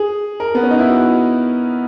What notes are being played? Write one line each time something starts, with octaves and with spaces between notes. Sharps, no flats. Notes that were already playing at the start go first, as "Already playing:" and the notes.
Already playing: G#4
A#4
B3
C#4
D#4
E4
F#4